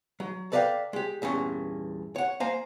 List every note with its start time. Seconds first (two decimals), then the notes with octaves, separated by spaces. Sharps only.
0.20 F#3
0.52 A4 B4 D5 D#5 F5 G5
0.93 G#3 G4
1.22 E2 G2 A#2 C#4
2.16 C#5 F#5
2.40 A#3 C5 G#5 A#5